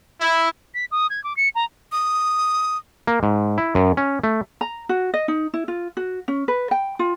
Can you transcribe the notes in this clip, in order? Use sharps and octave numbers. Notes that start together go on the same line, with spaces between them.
E4
B6
D#6
G#6
D6
C#7
A#5
D#6
A#3
G#2
E4
F#2
C#4
A3
A#5
F#4
D#5
D#4
E4
F4
F#4
C#4
B4
G5
F4